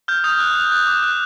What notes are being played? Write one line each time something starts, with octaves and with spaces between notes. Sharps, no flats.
F6 G6
D#6 G6
F#6
D#6
F#6
D6
F#6